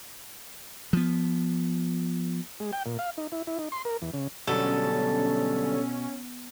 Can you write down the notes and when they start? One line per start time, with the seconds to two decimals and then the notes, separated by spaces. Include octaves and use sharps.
0.93 F3 B3
2.60 G#3
2.73 G5
2.86 A#2
2.99 F5
3.18 D#4
3.32 E4
3.47 E4
3.59 D#4
3.72 C6
3.85 A#4
4.02 E2
4.14 C#3
4.48 B2 D3 F#3 G3 C#4 A4